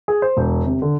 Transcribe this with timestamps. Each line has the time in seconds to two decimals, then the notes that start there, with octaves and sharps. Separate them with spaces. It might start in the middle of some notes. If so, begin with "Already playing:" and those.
0.08 G#4
0.22 C5
0.37 E1
0.66 C3
0.82 D3